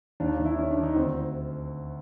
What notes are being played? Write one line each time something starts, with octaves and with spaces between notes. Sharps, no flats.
D#2 D4
D#4
D#2
E4
D#3 C#4
D4
D#3
D#4
D2 C4